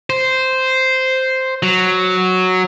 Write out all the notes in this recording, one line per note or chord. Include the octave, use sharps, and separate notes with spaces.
C5
F#3